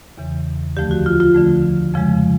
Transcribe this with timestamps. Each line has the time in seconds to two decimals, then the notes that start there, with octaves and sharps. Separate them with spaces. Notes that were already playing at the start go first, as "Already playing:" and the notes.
0.18 E2 C#3 E3
0.77 D2 D3 F3 A3 G4
0.91 F#4
1.06 F4
1.20 F4
1.35 D2 D3 F3 A3
1.94 F2 C#3 F3 G#3